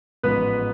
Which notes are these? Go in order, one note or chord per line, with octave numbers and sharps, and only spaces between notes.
A1 G#2 F3 B3 B4